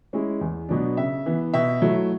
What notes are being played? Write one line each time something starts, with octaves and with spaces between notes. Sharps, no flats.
G#3 C#4 E4
E2
B2 F#3 B3 D4
C#3 E5
E3 B3
B2 E5
F#3 A3 E4